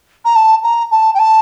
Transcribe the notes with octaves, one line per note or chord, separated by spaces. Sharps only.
A#5
A5
A#5
A5
G5
A5